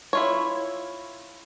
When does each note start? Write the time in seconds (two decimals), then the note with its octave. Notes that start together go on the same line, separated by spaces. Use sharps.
0.13 E4 F4 C#5